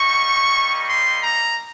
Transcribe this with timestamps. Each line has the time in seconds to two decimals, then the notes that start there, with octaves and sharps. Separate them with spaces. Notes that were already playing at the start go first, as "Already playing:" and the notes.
Already playing: G3 A#3 D#4 C#6
0.88 C6
1.23 A#5